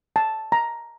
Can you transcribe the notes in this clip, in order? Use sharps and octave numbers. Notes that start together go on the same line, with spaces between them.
A5
A#5